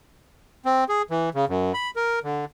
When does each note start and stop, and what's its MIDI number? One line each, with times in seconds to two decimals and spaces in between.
0.65 0.84 60
0.89 1.02 68
1.10 1.30 52
1.34 1.45 49
1.49 1.73 42
1.74 1.91 83
1.96 2.19 70
2.24 2.45 50